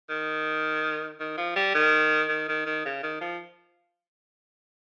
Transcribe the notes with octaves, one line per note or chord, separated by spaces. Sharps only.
D#3
D#3
F3
G3
D#3
D#3
D#3
D#3
C#3
D#3
F3